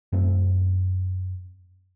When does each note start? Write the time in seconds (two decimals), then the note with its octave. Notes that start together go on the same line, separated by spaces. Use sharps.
0.12 F#2 A3 C4